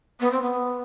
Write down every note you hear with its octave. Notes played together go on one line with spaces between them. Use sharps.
B3
C4
B3